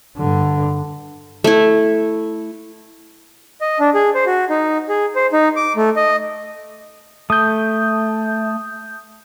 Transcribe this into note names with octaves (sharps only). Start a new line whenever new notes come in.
G2 D3
A3 E4
D#5
D4
G#4
C5
F#4
D#4
G#4
C5
D#4
D6
A3
D#5
A3 D#6 G6